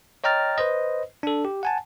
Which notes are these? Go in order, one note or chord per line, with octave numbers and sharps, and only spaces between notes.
C#5 D#5 G5 A#5 F6 A6
B4 C5 D#5
D4 A4
G4
F#5 G#5 A5